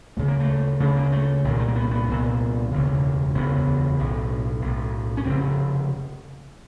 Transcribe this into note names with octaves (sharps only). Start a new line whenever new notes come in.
D2 C#3 A3
A#3
A3
D2 C#3 A3
A#3
A3
C2 A#2 D#3
A3
A#3
B3
B3
C2 A#2
E1 D2 C#3
E1 D2 C#3 B3
B1 A2
B1 A2
C#4
F1 D#2 C#3 C4